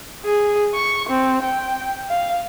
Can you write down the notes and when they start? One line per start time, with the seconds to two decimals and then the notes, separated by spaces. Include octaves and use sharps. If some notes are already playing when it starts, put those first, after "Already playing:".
0.25 G#4
0.74 C#6
1.09 C4
1.42 G5
2.09 F5